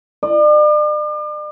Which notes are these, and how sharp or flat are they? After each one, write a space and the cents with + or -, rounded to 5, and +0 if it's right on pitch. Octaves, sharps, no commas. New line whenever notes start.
D5 +40